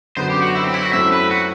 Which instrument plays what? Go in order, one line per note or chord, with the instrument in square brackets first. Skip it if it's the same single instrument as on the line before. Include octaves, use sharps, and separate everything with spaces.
[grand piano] F#2 D3 F#3 B3 [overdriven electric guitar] C5
[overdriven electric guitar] G4
F#4
E4
C4
E4
F#4
[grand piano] F#2 F#3 A3 C4 E4 [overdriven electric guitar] E5
[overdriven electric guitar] B4
F#4